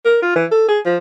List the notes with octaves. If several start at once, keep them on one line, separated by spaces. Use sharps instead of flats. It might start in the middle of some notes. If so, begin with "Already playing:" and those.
A#4
F4
E3
A4
G#4
F3